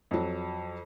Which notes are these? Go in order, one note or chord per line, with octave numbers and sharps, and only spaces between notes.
F2 F#3